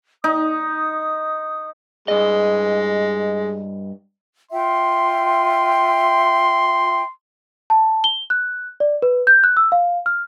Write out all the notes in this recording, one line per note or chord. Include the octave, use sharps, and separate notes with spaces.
D#4 D#6
G2 G#3 D#5
F4 E5 G5 C6
A5
G7
F#6
D5
B4
G6
F#6
E6
F5
F6